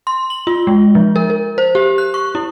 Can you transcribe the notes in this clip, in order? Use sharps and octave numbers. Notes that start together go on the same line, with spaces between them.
C6
F#7
F4
G#3
F3
A#4
A#4
C5
G4
F#6
C#6
E4